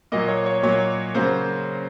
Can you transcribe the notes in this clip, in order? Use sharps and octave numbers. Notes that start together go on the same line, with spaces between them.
A#2 F#3 A#3 D#5
C#5
C#5
A#2 F#3 A#3 C#5
C#3 F#3 A#3 C5